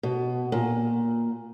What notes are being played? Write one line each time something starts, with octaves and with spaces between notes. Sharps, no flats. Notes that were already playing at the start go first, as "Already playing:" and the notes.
B2
A#2